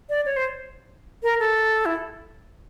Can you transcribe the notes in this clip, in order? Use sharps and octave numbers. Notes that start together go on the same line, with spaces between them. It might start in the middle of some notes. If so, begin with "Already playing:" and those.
D5
C#5
C5
A#4
A4
E4